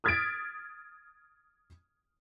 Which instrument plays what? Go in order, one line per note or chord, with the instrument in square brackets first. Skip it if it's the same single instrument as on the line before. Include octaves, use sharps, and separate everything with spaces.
[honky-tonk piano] D#6 F6 G#6 A6 B6 D7